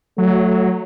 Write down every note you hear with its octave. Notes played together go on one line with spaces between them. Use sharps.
F#3 A3